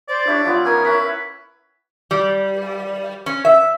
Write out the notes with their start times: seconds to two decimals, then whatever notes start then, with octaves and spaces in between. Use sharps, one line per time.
0.09 C5 D5
0.27 D4 E4 G4 C#5
0.45 F3 B3 E4 F4
0.65 C#4 D#4 A#4 G#5
0.85 C#4 E4 B4 C#5
2.11 G3
3.26 C#4
3.45 E5